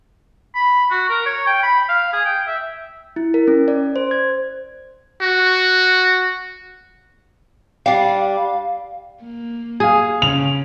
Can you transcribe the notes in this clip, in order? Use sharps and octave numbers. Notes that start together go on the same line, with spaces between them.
B5
F#4
A#4
C#5
G5
B5
F5
G#4
G5
E5
E4
A#4
C#4
D5
C5
G#6
F#4
G3 D4 F5
A#3
G#4 F5 G#5
C#3 F7